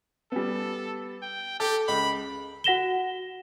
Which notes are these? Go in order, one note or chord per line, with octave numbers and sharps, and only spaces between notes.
G3 B3 A4
G5
G4 A4
C#2 B5
F#4 F#5 A#6 E7 G7